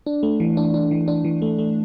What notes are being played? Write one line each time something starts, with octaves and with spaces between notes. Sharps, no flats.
D4
A3
E3
D4
D4
E3
D4
E3
A3
A3